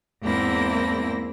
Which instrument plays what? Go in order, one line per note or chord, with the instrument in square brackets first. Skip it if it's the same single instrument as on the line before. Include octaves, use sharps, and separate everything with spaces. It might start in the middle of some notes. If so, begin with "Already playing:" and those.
[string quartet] E2 G#2 A#3 C4 E4 A#6